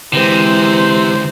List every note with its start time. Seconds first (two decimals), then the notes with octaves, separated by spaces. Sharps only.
0.13 D2 C3 E3 G#3 C5